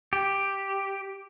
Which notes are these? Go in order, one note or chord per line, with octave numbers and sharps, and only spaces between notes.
G4